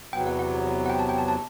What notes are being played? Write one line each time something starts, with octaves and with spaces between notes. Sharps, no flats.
E2 C3 F#3 B3 G5
F#5
F#5
F#5
G5
A5
G5
A5
A5